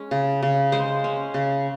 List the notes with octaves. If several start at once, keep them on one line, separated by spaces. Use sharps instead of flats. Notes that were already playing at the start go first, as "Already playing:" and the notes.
Already playing: G#3 C#4
C#3
C#3
G#3 C5
C#4
C#3